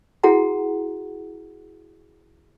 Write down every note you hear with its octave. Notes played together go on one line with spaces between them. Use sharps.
E4 F#4 G#4 F#5 A#5